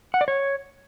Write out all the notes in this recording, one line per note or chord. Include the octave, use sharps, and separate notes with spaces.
F#5
D5
C#5